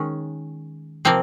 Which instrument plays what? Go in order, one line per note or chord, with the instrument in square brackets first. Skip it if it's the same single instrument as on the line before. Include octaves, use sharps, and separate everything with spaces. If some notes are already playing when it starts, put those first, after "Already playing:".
Already playing: [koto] D#3 G#3 C#4
C3 F3 A#3 C4